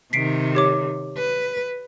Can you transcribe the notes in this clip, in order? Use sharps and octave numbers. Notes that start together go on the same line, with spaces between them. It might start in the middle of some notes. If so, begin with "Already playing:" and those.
C3 D#3 B6 C7 D7
G4 C#5 D6
B4